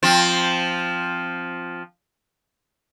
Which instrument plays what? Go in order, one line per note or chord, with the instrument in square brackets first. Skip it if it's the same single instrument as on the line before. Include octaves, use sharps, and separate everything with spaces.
[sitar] F3 C4